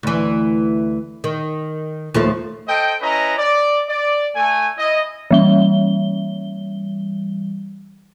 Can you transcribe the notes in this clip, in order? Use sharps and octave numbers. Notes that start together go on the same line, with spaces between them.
D2 E3
D#3
D#2 F3 A3
A4 C5 D#5 G5
C#4 E4 B4 D#5 A#5
D5
D5
A3 G#5
E4 D#5
E3 G3 G7